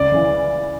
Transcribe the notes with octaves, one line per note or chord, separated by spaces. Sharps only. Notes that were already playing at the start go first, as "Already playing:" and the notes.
Already playing: C#2 D5
C#3 E3